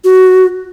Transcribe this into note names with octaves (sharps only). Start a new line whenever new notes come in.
F#4